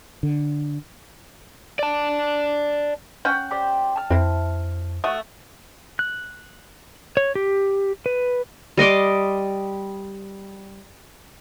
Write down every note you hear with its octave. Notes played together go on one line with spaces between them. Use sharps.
D3
D5 A5
C#4 F#5 G5
G4 C5 D5
A5 F6
F2 C4 E4
A3 F#4 D#6
F#6
C#5
G4
B4
G3 D#5 C6 D6